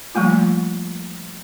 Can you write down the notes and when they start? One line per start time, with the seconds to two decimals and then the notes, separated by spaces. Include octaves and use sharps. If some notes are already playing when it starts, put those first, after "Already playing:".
0.15 F3 G3 A3 A#3 F4